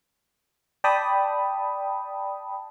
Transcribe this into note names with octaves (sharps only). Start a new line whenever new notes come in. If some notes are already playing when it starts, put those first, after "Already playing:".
D5 G5 A5 B5 D#6